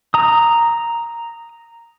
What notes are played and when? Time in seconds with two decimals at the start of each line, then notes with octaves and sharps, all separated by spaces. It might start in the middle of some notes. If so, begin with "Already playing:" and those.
0.14 A#5 D#6